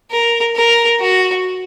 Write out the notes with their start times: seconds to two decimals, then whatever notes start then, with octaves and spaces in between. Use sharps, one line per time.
0.11 A#4
0.56 A#4
1.01 F#4